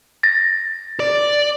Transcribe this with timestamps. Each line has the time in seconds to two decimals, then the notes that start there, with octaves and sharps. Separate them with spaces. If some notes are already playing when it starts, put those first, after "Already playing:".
0.23 A6 A#6
1.00 D5